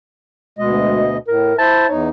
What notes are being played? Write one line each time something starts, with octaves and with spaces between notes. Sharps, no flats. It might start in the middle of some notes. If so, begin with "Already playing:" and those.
D2 B2 G#3 D#5
A2 A#4
E4 C5 E5 A5
E2 D#4 C#5